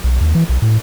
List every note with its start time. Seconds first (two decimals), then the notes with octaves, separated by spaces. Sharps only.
0.04 B1
0.21 D#2
0.35 E3
0.49 B1
0.62 A2